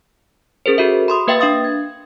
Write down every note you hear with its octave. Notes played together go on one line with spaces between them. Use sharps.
C#4 G#4 A#4 C5
F#4 A4 E5
B5 C6 D#6
A#3 B4 E5 F5 G5 A6
D4 F5 D#6 A6
G#6